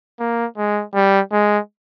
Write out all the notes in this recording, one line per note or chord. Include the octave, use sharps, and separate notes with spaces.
A#3
G#3
G3
G#3